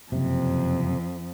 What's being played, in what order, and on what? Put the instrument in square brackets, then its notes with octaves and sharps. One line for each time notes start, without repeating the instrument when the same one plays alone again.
[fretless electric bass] F#1 C3 [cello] F2